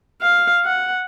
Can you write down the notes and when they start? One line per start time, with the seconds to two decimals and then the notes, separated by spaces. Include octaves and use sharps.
0.22 F5
0.65 F#5